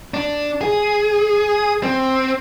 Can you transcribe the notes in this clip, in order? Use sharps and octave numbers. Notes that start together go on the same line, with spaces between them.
D4
G#4
C4